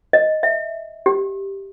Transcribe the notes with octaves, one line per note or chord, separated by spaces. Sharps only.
D#5
E5
G4